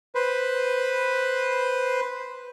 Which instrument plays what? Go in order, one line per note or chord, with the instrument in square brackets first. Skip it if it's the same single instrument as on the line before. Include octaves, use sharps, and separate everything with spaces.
[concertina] B4 C5